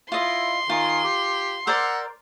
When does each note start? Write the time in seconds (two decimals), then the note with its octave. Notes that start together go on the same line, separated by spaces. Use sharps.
0.12 E4 F4 D#5 C6
0.69 D#3 F4 G#4 A#4
1.04 G4
1.67 A#4 C5 D5 F#5 A#5 E6